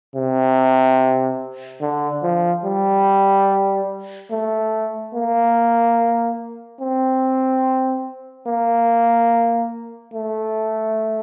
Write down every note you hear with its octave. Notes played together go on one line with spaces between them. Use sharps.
C3
D3
F3
G3
A3
A#3
C4
A#3
A3